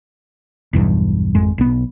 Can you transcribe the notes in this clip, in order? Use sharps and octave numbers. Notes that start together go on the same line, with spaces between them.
B1 E2 G2
G#1 F2 G#3
B1 B3